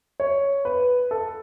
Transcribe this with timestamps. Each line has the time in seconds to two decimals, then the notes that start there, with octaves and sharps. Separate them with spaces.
0.20 C#5
0.65 B4
1.11 A4